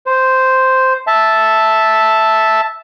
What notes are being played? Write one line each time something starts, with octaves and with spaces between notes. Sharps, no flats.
C5
E5 A5